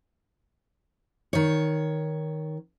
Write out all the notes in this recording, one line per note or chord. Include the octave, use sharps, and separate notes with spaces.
D#3 C#5